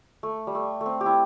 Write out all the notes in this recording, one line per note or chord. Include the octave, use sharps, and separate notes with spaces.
A3
G3
A3
A3
C4
G4
E4